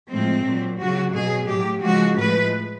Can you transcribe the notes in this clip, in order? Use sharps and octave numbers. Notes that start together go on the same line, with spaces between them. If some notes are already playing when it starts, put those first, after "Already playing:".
A2 F3 G#3 C4
A#2 F#3
C#3 F#3 F#4
B2 F#3 G#4
A2 F#3 G4
C#3 F3 G#3 F#4
A2 F3 G#3 B4